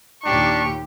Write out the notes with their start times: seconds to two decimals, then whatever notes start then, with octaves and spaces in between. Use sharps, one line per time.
0.25 D#2 A#2 D4 G4 C#6